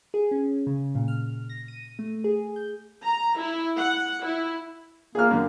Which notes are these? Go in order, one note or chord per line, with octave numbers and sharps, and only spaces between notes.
G#4
C#4
C#3
A#2
F6
A#6
D#7
A3
G#4
G6
A#5
E4
F#5
E4
A#3 G#4 F6
F#2 D3